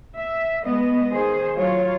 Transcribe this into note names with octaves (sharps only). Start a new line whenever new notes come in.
E5
G#3 B3 D#5
D#3 G#4 C5
F#3 F4 C#5